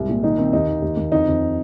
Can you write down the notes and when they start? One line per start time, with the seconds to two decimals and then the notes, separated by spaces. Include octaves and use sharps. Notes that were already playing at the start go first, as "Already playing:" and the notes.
Already playing: C2 G#2
0.09 A#2
0.23 D#3 D#4
0.38 D#3 C4
0.53 D#2 D#4
0.68 D#3
0.82 D#2
0.97 D#2
1.12 F2 D#4
1.27 F2